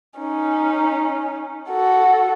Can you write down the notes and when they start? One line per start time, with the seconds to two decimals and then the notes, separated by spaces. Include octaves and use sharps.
0.19 C#4 D#4
1.70 F#4 A4